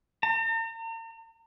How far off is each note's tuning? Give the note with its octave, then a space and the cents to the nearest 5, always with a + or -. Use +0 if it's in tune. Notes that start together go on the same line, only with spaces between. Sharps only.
A#5 -45